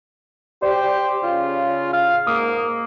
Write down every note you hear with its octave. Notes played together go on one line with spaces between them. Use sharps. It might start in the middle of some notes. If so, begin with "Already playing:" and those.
G4 C5 D5
C#3 F4
F5
G#2 A#3 D#6